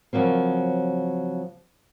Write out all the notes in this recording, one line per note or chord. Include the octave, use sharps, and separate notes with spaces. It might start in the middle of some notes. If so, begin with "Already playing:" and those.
C#3 F3 F#3 A#3 C4